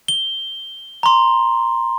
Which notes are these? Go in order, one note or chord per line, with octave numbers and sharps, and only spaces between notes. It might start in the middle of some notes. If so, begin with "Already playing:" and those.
G7
A#5 C6